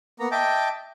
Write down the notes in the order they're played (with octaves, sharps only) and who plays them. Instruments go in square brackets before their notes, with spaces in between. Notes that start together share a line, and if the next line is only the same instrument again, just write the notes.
[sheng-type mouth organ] A#3 B3 A#5
D#5 E5 G5 A5 D6